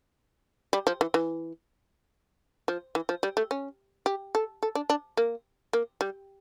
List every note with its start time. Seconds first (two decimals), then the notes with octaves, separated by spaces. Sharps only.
0.73 G3
0.87 F3
1.01 E3
1.14 E3
2.68 F3
2.95 E3
3.09 F3
3.23 G3
3.37 A3
3.51 C#4
4.06 G4
4.35 A4
4.63 A4
4.75 D4
4.90 D4
5.17 A#3
5.73 A#3
6.01 G3